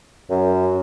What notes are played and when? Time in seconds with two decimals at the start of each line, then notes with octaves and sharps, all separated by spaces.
0.30 F#2